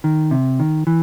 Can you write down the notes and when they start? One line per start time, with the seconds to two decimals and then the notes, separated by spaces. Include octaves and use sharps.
0.04 D#3
0.31 C3
0.60 D#3
0.87 E3